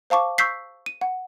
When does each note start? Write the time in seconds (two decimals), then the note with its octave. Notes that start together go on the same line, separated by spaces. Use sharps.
0.10 C5 F5 A5 C#6 D6
0.38 C#6 E6 G6 B6 C7
0.86 D#7
1.01 F#5